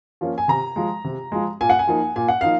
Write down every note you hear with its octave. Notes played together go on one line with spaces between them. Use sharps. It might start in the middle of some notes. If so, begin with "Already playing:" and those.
F3 A#3 C#4
G#5
C3 A#5
F3 G#3
C3
F3 G#3
A#2 G#5
F#5
G#5
F3 A#3 D#4
A#2 G#5
F#5
F3 A#3 D#4 F5